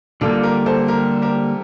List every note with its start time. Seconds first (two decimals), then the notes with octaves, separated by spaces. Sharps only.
0.21 D3 G3 A#3 F4 A4
0.43 G4 A#4
0.66 A4 C5
0.88 G4 A#4
1.22 G4 A#4